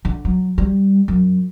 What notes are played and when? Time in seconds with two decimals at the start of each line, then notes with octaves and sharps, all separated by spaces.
0.05 D3
0.25 F#3
0.58 G3
1.08 F#2